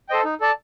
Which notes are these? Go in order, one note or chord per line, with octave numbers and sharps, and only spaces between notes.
A4 C5 D#5 G5
D#4
A4 D5 A5